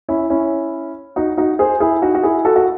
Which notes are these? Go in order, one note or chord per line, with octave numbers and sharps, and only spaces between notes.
C#4 E4
C#4 E4
D#4 F#4
D#4 F#4
G#4 C5
E4 G#4
D#4 F#4
F#4
E4 G#4
F#4 A4
F#4